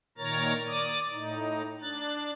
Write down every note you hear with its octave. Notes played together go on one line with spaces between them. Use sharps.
A#2 D#3 A#4 C#5 A#5 A6
D5 D6 D#6 A6
A2 D#4
D4 F#6 A6